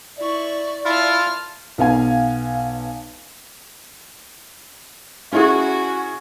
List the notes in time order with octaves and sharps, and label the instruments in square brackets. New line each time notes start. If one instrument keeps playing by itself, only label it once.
[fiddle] E4 C#6 [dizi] D5
[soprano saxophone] E4 [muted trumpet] F4 [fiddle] A5 F6
[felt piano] B1 B3 F5 G#5
[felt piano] C#4 E4 G#4 [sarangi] F#4